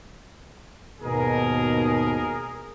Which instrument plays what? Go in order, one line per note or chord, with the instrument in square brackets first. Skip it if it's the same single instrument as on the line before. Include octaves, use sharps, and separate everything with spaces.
[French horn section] D#2 G#2 B2 [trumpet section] G#4 A#4